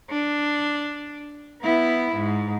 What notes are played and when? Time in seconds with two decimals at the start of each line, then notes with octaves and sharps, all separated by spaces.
0.10 D4
1.62 B3 E4
2.14 G#2